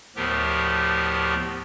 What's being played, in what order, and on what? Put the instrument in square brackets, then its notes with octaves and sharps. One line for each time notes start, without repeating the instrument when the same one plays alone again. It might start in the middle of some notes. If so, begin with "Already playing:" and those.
[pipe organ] D2 A2 F3 B3 G4 A#4